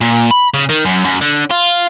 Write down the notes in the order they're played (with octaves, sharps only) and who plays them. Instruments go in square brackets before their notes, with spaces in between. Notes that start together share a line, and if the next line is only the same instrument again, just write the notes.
[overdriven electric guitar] A#2
B5
C#3
D#3
F#2
F#2
D3
F4